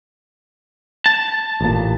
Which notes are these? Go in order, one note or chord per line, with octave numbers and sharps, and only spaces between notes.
A5
A1 A#2